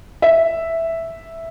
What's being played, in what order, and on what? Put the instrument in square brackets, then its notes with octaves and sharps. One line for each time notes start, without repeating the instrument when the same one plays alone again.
[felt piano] E5